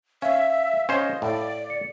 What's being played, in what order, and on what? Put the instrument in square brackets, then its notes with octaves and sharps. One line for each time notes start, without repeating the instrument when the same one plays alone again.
[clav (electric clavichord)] C#4 [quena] E5 [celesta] F5
[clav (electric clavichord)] C#4 C5 [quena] D#5
[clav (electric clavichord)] A2 [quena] D5
[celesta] C#7